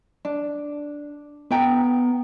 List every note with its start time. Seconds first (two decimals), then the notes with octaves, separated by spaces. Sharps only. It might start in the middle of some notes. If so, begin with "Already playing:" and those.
0.25 D4
1.51 B3 B4 G5 A#5